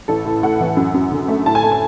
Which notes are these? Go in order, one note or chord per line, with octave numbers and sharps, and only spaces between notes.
A1 A4
A2
A2 F#5
E3
F#2
F#2
D3
A3
A2 A5
G#5
A3 A5
G#5